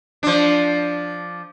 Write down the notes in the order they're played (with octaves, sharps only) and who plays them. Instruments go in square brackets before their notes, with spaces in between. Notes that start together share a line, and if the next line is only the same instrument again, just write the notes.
[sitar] F3 D4